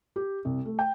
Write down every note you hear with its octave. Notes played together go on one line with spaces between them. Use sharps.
G4
C2
A3
G5